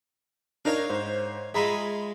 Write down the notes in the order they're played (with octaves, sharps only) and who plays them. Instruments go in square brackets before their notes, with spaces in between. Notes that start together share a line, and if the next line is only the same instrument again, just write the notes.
[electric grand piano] D4 D#4 A#4 [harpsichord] C#5 F5
[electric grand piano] G#2 C5
[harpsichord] G#3 F4 E5 [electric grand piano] G#4 A#5 B5